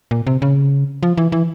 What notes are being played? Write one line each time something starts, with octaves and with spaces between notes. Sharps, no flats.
A#2
C3
C#3
F3
E3
E3